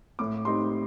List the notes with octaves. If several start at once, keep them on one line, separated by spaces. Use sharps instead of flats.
A2 D6
G3 C4 D#4 C6